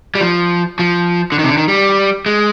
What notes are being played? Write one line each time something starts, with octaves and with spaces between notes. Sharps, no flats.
G3
F3
F3
D3
D#3
C3
D3
D#3
G3
G#3